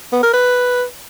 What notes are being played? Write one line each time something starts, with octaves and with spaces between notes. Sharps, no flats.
B3
A#4
B4